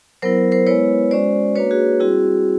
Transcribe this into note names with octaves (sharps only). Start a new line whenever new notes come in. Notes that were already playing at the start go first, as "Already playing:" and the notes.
F#3 B3 E4 A#4 C5
A#4 C5
G#3 B3 E4 B4 C#5
G#3 C#4 F#4 C5 D5
A#3 D4 F#4 B4 C#5
F#4 G#4
G3 C4 E4 F#4 G#4